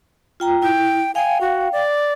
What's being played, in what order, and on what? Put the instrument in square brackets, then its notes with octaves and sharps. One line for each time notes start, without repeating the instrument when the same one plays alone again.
[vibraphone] F4 G5 A#5
[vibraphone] E4 [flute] G5
[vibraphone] F5 G5 [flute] G#5
[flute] F#4
D5